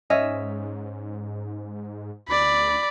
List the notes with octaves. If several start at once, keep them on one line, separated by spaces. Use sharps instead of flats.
G#2 C#4 D#5 E5
D2 D5 B5